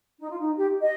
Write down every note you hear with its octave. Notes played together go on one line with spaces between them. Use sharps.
D#4
F4
D#4
G4
D#5